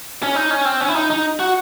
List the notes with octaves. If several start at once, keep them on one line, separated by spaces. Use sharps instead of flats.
C#4
D#4
C#4
C4
C#4
E4
D#4
D#4
F#4